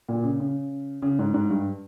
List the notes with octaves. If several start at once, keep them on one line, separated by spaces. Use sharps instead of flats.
A#2
C#3
C#3
C#3
G#2
G#2
G2